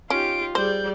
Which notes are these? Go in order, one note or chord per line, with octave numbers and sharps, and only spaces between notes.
C#4 D#4 F4 G4 D7
G3 G#4 C5 D5 G6